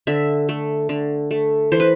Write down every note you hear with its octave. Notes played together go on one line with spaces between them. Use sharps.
D3 E5
A3
D3
A3
E3 C5
B4